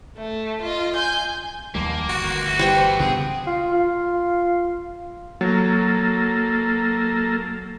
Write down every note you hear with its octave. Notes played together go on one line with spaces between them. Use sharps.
A3
F4 D#5
G#5 G6
D#2 F3 G3 A#3
G1 F#4
E3 B3
G3 C5 G5
C#3 B3 C4 D4 G#4
F4
F4
F#3 A#3 A4